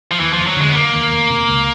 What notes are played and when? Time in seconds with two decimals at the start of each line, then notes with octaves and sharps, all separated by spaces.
0.11 F3
0.20 D#2 E3
0.33 F3
0.39 F1
0.47 F#3
0.56 D3 G#3
0.69 B3
0.74 F1 A#3
0.94 D#2
1.11 F1
1.30 C3
1.48 C#2